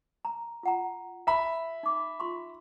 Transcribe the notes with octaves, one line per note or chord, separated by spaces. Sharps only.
A#5
F4 F#5 A#5
E5 B5
D#4 D6
F4 C6 C#6